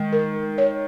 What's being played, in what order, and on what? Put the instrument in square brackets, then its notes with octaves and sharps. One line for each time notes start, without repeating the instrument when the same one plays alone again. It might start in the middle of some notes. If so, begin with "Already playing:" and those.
Already playing: [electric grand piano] D#3 [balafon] G#3
[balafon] A#4
C#5